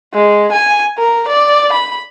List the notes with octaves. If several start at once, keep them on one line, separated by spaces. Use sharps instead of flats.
G#3
G#5
A#4
D5
B5